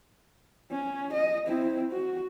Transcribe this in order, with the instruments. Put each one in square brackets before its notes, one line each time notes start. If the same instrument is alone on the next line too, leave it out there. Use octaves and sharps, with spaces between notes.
[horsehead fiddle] C#4
D#5
C4 E4
F#4